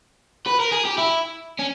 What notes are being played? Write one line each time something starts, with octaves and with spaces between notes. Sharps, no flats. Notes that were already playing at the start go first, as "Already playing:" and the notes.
B4
A#4
G#4
G4
E4
C#4